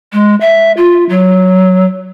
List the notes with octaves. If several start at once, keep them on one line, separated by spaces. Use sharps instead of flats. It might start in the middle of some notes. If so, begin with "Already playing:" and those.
G#3
E5
F4
F#3